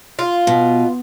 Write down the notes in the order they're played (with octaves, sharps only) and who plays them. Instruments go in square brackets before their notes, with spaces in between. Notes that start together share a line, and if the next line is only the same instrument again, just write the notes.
[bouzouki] F4
[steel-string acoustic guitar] B2